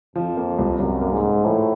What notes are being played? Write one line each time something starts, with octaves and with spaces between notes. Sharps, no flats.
F2 F3
A#3
C2
C2 F#2
A#3
G#2
A#3
A2 F3